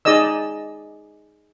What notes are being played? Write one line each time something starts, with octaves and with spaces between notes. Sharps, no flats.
D#4 G#4 D5 D#5 E6